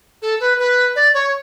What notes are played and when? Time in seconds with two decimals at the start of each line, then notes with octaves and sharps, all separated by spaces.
0.22 A4
0.40 B4
0.59 B4
0.96 D5
1.14 C#5